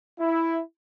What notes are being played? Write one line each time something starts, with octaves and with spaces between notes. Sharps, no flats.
E4